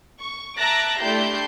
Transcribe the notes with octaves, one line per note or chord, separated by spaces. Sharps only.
C#6
E5 A5 A#5 D6 F#6 A#6
A3 D4 E4 G4 C6 G6